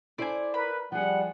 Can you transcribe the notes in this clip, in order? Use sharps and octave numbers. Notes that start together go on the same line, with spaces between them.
E4 A4 C5 D5 G#5
A#4 B4 B5
F3 G3 G#4 F#5